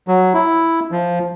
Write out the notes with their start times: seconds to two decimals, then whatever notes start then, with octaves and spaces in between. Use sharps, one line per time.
0.08 F#3
0.34 E4
0.92 F3